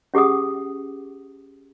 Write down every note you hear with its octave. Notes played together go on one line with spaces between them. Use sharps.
C#4 G4 G#4 F#5 D#6